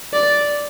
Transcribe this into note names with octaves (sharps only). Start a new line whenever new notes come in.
D5